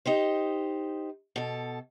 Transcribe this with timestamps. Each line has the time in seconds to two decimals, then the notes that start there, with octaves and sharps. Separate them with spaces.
0.06 D#4 G4 C5
1.36 B2 A4